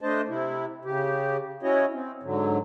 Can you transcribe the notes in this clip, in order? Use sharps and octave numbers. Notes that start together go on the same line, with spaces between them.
A3 D4 C5 D#5 A5
C3 E4
C#3 G4
C#4 E4 F#4 C#5 D#5
C4
G#2 D3 F#3